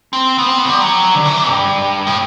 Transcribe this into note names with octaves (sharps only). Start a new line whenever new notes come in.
C4
B3
C4
B3
F#3
G3
F#3
D3
E3
D3
G2
A2